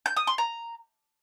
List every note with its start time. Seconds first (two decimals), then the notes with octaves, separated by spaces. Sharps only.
0.06 G6
0.17 D#6
0.27 C6
0.38 A#5